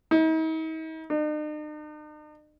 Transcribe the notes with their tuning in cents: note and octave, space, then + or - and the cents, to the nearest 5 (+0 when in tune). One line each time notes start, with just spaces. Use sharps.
D#4 +45
D#4 -45